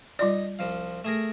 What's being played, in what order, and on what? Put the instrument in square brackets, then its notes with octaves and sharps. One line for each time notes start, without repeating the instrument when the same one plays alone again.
[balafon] G3 F4 D5 [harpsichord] D#4
[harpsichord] C2 F3 F5
A3 G#4 A#4